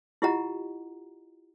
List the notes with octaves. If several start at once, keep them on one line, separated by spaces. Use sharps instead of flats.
E4 F4 G4 D#5 F#5 A#5